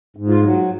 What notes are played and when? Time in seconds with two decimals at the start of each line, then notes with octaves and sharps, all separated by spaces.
0.16 G#2
0.29 F4
0.43 F#3